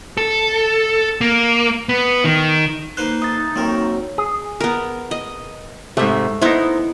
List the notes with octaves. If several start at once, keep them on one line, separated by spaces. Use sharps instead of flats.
A4
A#3
B3
D#3
A#3 D#4 B4 C5 F#6
A4 E5 D#6 A6
D#3 F#3 A#3 C4 A4 A#4
G#4
B3 A#4
D#5
G#2 C3 A3 E5
B3 D#4 E4 C5